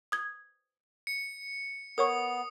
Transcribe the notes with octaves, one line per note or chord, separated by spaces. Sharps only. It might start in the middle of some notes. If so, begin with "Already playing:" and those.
D#6 G#6
C#7
B3 A#4 C#5 C#6 D#6